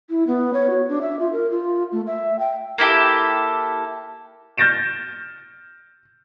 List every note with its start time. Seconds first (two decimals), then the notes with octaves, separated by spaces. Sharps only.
0.10 E4
0.27 B3
0.54 C#5
0.70 F#4
0.89 D4
1.01 E5
1.19 F4
1.33 A#4
1.51 F4
1.92 A3
2.07 E5
2.39 G5
2.78 A#3 E4 G4 A4
4.57 F6 G6 A6 A#6 D7 E7